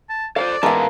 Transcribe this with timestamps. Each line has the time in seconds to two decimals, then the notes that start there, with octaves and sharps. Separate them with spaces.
0.09 A5
0.36 F4 A4 B4 C5 D5 F5
0.63 E3 G#3 B3 A#4 B4 E5 F5 A5